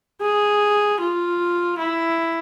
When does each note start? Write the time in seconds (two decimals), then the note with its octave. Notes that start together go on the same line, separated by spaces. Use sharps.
0.21 G#4
1.00 F4
1.79 E4